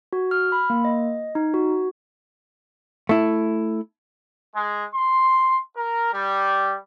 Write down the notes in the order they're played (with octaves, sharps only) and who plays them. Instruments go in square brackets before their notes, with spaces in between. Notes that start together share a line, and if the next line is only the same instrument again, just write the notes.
[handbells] F#4
F6
B5
A#3
D#5
D#4
F#4
[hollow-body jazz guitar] A3 E4
[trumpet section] G#3
C6
A#4
G3